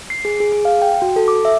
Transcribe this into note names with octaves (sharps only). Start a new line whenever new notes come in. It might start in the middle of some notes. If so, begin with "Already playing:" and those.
C7
G#4
G#4
G#4
F5
G5
F#4
A4
D6
E5